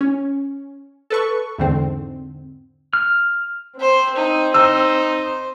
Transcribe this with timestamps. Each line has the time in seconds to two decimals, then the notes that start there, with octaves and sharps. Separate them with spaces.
0.01 C#4
1.10 A4 B4 C#6
1.58 E2 G#2 D3 C4
2.93 F6
3.80 C4 C5
4.15 D#4
4.54 D#4 C5 E6